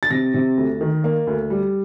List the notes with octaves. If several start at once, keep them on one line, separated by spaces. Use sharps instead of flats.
A6
C3 A#6
C3
D2
D#3
A#3
D2
G3